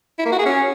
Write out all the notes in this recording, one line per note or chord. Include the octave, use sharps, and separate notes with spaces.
E4
A#3
F#4
G#4
C#4